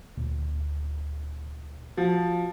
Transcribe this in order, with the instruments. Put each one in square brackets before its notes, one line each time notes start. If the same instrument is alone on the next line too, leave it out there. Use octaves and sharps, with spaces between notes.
[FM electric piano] D2 A#2
[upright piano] F3 [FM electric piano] F#4